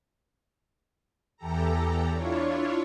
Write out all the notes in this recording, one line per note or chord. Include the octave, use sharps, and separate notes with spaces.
E2 E3 G4 A4 A#5
D4 E4 F4 C#5